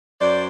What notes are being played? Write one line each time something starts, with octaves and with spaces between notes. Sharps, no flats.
F#2 C5 D5